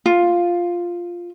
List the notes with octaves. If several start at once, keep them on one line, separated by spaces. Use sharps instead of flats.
F4